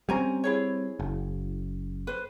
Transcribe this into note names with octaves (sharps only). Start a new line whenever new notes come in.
G3 C4 C#4 G#5 A#5
E4 G#4 C#5
F#1
B4 C5